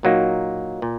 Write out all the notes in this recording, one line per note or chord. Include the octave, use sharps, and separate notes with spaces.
A#2 F#3 A#3 D#4
A#2